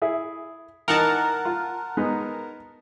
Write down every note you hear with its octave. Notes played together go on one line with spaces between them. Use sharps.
E4 G#4 E5
E3 D#4 A#4 F#5 A5
F4
G#3 B3 D#4